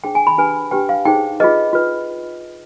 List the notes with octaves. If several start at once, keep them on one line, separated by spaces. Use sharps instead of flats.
D4 G#4 C5 G5
G#5
B5
D4 G4 B4 G#5
D4 G4 B4 G5
F5
D#4 G#4 C5 G5
F4 G#4 B4 D#5
F4 B4